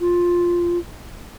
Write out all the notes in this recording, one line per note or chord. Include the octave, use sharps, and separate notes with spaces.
F4